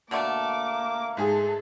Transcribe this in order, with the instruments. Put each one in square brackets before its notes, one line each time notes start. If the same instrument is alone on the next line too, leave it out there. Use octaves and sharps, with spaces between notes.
[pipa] B2 D3 A3 [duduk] A#3 [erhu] D6
[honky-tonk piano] G#2 G#4 [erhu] A4